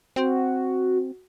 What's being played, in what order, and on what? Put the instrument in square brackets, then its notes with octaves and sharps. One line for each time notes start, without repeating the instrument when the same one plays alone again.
[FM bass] C4 [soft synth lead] F#4